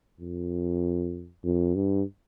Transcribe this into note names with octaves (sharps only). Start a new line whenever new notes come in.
F2
F2
G2